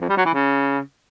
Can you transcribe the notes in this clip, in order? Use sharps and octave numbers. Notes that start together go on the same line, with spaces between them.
F2
G3
F#3
E3
C#3